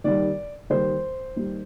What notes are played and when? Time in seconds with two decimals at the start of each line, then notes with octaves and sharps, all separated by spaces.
0.04 D#2 D#3 G3 D5
0.70 D#2 D#3 G3 C5
1.36 D#2 D#3 G3